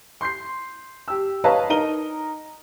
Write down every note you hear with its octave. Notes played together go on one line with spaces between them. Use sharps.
C6 G6 C7
G4 E6
B4 C#5 D#5 F5 A5 A#5
D#4 A#4 A#5 D#7 G7